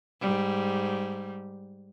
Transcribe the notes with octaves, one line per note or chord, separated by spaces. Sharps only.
G#2 G3